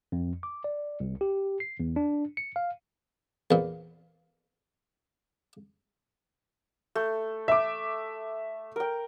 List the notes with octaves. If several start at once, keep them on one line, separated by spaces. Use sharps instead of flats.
F2
D6
D5
C2
G4
C7
E2
D4
C#7
F5
E2 A#2
A3
E5 D6
A#4 G5